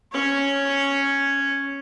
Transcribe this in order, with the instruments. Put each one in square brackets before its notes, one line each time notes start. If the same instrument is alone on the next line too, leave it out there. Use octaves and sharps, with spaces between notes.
[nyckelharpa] C#4 C#5